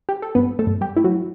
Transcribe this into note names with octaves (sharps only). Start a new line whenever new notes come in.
G4
A4
G2 B3 B4
A3 A4
G2
G3 G4
A3 E4
F#3 F#4